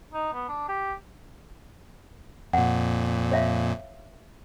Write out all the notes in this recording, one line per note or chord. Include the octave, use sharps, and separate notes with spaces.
D#4
B3
D4
G4
F2 A#2 F#5
C#5 E5 F5